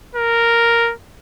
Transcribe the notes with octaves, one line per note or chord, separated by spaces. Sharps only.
A#4